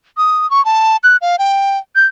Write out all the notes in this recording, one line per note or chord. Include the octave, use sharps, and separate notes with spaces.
D#6
C#6
A5
F#6
F5
G5
G6